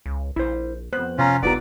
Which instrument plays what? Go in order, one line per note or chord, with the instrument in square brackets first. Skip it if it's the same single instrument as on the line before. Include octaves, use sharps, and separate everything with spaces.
[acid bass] C#2
[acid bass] A#1 [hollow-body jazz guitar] E4 C5
[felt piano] F2 F#6 [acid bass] B3 [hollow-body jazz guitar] C5
[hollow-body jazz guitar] C3 A#5 [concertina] C#4 F4
[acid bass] E1 [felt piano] B1 F4 A#5 [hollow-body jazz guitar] B3 G4 [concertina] D5